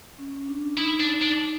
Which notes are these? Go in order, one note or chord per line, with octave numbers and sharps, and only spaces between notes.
C#4
C#4
D4
D#4 E4
D4
D4